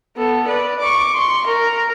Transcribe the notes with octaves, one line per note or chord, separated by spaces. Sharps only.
B3 A4
B4 D5
C#6 D6
C6 C#6
A#4